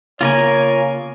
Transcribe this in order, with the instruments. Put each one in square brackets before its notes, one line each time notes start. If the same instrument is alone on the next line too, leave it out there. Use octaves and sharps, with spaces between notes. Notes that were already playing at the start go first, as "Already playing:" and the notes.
[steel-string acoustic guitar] C#3 A#3 [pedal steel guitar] F4 A#4 G#5 [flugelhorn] C#5